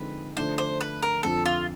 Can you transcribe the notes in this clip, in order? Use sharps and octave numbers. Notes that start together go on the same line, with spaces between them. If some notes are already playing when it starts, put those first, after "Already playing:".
Already playing: D3 F3 G#3 C4 D#4 B4
D3 F3 A3 D4 C5
C5
B4
A#4
F2 D3 F3 A4
F4